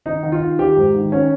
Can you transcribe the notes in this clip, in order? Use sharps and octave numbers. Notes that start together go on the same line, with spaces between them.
D#3 D#4
D#3
F4
D#3
D#3 G4
G#2
D#3
D#3 C#4